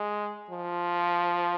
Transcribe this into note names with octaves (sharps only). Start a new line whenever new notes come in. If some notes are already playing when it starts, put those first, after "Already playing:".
Already playing: G#3
F3